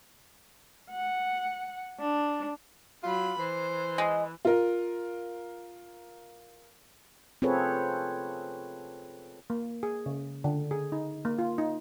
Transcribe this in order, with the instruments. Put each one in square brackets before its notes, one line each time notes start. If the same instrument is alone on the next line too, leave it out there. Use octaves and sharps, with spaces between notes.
[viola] F#5
D4
[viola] F#3 B5 [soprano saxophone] F4
[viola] E3 [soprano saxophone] C5
[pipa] G#3
[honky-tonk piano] F4 A#4
[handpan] C4 F4 G#4 A4 B4 C#5
[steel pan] A#3
G#4
C#3
D3
G#4
D#4
A#3
F4
D#4